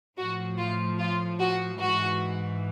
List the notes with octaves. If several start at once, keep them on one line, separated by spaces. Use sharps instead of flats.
A2 F3 F#4
F4
F4
F#4
G#2 E3 F#4